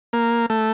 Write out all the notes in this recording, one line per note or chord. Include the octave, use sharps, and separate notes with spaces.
A#3
A3